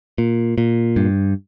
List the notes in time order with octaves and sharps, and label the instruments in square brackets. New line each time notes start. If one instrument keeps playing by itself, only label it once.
[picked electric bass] A#2
A#2
G2